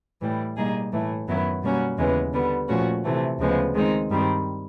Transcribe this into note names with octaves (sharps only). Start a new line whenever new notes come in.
A2 E3 G3
B2 G3 A#3 D#4 G#4
A2 E3 A3
F#2 D#3 F#3 B3 E4
B2 G3 A#3 C#4 F#4
D#2 C#3 E3 G#3 B3
D3 G3 B3
A#2 F3 A3 C#4 F#4
C3 E3 A3
D2 C#3 F3 G#3 B3
D#3 G#3 C4 D#4
G2 D#3 G3 C4